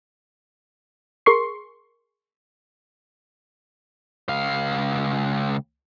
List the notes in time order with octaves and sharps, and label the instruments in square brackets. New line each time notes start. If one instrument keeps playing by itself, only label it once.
[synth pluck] G#4 A#4 C6 C#6 C7
[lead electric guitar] C#2 F5